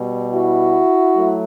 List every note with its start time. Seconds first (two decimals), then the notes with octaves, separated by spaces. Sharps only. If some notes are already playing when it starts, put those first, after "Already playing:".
Already playing: B2 G3
0.33 E4 F#4
1.15 F#3 A3